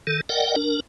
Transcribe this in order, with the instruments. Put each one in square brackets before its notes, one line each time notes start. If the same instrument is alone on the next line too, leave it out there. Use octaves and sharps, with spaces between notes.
[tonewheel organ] D#3 A4
A#4 D5 D#5 F#5 G5
D4 A#4